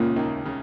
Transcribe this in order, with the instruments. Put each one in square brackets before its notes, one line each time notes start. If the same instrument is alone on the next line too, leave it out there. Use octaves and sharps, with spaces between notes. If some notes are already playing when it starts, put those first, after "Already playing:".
Already playing: [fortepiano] C#2 C#3 [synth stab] A#2 A#3 F4
[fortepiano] D#2 D#3
C#3